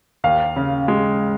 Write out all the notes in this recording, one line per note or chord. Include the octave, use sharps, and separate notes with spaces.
D#2 F5
C#3
G#3